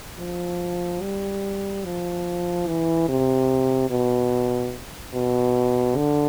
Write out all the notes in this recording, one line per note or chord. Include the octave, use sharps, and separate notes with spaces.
F3
G3
F3
E3
C3
B2
B2
D3